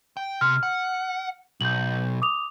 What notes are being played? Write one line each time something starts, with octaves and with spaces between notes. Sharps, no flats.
G5
C3 C6 F6
F#5
B1 G6 F#7
D6 D#6 F7